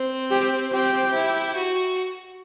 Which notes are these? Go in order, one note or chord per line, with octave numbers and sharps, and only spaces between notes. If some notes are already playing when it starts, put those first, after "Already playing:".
Already playing: C4
G4
C4 G4
E4
F#4